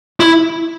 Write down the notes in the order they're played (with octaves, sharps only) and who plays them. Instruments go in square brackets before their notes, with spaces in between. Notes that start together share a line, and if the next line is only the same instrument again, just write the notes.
[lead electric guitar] E4